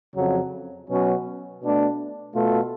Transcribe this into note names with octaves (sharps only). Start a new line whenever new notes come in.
F2 C#3 F#3
B2 F#3 C#4 F#4
B2 A3 D4
B2 A3 F4 A4